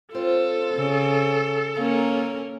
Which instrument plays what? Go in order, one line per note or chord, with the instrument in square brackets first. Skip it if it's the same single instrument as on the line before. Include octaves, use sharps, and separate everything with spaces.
[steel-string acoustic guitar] C4 C5 C#5 [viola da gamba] F4 [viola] A4
[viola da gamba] C#3
[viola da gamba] A#3 C#4 A#4 [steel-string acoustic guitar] F5 A#5